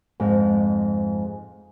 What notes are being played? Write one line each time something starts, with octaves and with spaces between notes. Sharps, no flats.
F2 G#2